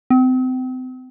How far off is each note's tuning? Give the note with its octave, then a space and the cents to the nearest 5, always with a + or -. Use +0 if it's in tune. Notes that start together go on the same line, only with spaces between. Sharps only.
C4 -35